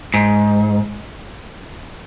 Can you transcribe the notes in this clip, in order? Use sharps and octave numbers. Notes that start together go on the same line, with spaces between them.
G#2